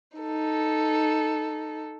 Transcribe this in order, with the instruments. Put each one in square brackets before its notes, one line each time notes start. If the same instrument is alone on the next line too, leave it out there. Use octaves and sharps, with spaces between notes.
[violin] D#4 A4